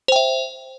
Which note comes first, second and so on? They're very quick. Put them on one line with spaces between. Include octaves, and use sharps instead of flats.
C5 G5 E5